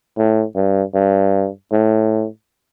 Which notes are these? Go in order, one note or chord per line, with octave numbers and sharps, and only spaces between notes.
A2
G2
G2
A2